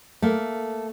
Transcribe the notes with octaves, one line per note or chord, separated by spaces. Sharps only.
A3 A#3